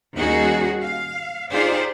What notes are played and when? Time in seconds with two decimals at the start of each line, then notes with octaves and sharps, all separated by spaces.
0.16 D#2 G3 C#4 D#4 F#4 G#4
0.82 F5
1.51 D#4 F4 G4 G#4 C5 D5